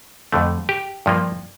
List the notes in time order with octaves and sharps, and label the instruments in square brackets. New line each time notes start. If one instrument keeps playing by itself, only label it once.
[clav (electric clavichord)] F2 D3 A3
G4
G2 F3 A#3